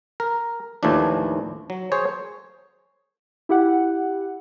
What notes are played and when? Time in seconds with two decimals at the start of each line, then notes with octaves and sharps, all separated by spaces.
0.20 A#4
0.83 D#2 A2 E3 F3 D4
1.70 F#3
1.92 G#4 C5 C#5
3.49 E4 G4 F#5